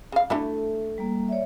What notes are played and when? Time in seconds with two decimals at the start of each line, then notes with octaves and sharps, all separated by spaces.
0.12 C#3 F5
0.30 A3 D4 E4 F#4
0.98 G3 A#3
1.29 C#5 D5 E5